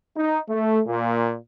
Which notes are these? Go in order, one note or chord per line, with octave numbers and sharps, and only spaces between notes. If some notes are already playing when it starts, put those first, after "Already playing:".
D#4
A3
A#2